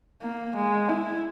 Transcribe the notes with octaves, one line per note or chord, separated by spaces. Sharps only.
A#3
G#3
E4